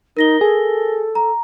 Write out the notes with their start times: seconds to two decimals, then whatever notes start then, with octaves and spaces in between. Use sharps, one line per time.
0.17 D#4 A#4 A#6 G7
0.41 G#4 A4
1.15 A#5